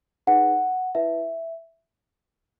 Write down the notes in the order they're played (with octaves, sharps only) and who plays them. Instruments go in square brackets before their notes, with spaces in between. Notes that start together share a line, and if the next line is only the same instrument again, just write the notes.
[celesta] D#4 G#4 B4 F#5
E4 B4 E5